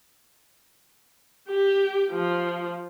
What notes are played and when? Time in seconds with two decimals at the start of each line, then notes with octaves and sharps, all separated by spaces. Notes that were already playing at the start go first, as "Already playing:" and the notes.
1.49 G4
2.11 F3